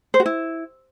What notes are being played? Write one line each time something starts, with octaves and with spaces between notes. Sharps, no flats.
C5
F#4
E4